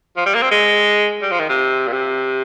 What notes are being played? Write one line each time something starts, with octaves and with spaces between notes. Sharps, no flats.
F3
G3
A#3
C4
G#3
G3
F3
D#3
C3
A#2
C3